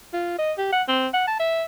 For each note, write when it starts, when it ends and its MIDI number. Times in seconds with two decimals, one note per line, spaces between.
0.13 0.35 65
0.38 0.52 75
0.58 0.69 67
0.72 0.82 78
0.88 1.08 60
1.14 1.24 78
1.27 1.36 81
1.39 1.64 76